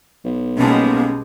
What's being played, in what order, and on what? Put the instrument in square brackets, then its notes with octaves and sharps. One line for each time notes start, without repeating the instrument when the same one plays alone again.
[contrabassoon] B1
[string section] B2 G3 G#3 [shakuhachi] A#3 [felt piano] C#4 A5